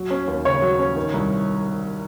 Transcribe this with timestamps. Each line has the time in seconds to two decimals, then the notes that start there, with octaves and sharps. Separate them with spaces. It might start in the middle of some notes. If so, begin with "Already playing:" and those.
Already playing: F#3
0.10 C#4
0.28 D#2
0.45 C#3 C#5
0.62 F#3
0.79 C#4
0.96 D#3
1.14 C2